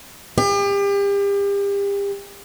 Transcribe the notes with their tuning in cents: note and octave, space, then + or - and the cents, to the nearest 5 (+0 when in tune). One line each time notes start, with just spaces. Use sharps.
G4 +35